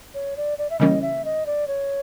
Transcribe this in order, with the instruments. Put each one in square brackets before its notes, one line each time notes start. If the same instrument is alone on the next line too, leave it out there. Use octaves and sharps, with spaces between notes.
[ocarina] C#5
D5
D5
E5
[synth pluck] C#3 E3 G3 A#3 C#4 [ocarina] D#5
[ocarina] E5
D#5
D5
C#5